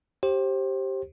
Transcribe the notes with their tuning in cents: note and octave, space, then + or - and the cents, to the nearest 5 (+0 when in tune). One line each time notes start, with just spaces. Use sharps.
G4 -10 C5 +25